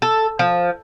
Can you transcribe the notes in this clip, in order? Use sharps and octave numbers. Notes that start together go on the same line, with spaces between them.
A4
F3